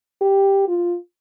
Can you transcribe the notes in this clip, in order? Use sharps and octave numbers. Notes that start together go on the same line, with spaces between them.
G4
F4